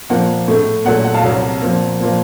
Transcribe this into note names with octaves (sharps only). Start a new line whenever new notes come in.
A#2 F3 A#3 F#5
A2 A3
A#2 F#3 A3 F#5
F#5
F5 A5
C2 C3 F#3
A#2 F3 A#3
A#2 F3 A#3